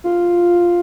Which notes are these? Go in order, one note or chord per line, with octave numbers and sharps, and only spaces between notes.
F4